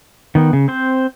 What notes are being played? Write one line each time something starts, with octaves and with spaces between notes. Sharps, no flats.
D#3 B3
C#3
C4 C5